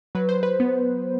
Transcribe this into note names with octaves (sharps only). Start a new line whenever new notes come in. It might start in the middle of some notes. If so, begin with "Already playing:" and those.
F#3 B4
C5
B4
B3